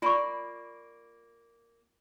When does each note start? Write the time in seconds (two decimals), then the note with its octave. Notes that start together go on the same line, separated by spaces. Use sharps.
0.02 A#3 F4 D5 B5 C#6